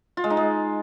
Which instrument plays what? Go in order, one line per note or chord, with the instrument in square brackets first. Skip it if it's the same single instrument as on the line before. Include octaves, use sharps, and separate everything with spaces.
[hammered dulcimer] F4
G#3
D#4
G#3